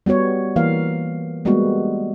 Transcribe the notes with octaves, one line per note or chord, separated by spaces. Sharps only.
G3 B3 F#4 C#5
E3 A#3 F5
G3 G#3 A#3 B3 F#4